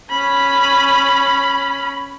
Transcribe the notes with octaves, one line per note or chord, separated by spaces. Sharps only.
C#4 B5